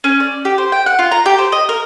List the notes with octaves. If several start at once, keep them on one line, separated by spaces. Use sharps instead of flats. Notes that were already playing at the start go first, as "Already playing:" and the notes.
C#4
D5
G4
C5
G5
F#5
F4
A#5
G4
C5
D#5
A#4